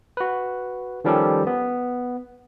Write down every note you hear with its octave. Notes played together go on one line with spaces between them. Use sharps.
F#4 B4
D#3 F3 G3 C#4 G4 A4
B3